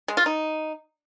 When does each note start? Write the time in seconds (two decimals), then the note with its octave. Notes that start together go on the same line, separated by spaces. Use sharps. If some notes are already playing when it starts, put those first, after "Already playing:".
0.08 G#3
0.17 F4
0.26 D#4